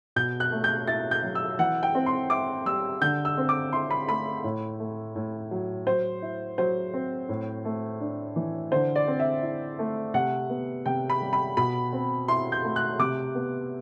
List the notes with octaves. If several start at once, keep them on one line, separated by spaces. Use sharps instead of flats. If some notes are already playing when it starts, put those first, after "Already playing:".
B2 G6
F#6
A3
G6
E4 A6
G6
F#3
E6
E3 F#5
G5
C4
C6
E4 D6
G3 E6
D3 G6
E6
C4
D6
E4 C6
B5
A3 B5
A2
A3
A2
F#3
F#3 C5
E4
F#3 C5
C4
A2
A3
D4
E3
D3 C5
D5
C4
E5
E4
A3
C3 F#5
B3
C3 G5
B5
G3
B5
B2 B5
C4
E4 C6
G6
A3
F#6
C3 D6
B3